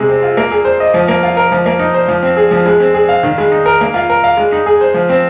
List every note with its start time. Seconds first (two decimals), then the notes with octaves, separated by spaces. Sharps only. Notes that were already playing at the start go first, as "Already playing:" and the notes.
Already playing: C3 G#3
0.09 C4
0.23 F4
0.37 A#3
0.52 G#4
0.65 C5
0.80 D#5
0.94 F3
1.08 A#3
1.23 F4
1.37 A#4
1.52 F3
1.66 A#3
1.79 D#4
1.94 C5
2.08 F3
2.23 C4
2.37 G#4
2.51 F3
2.66 G#3
2.80 C4
2.94 G#4
3.09 F5
3.23 D#3
3.38 G#3
3.52 D#4
3.66 A#4
3.81 A#3
3.94 F4
4.10 A#4
4.24 F5
4.37 G#3
4.52 D#4
4.66 G#4
4.81 C5
4.94 F3
5.09 C4